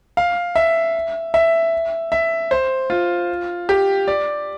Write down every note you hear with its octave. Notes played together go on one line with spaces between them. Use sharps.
F5
E5
E5
E5
C5
F4
G4
D5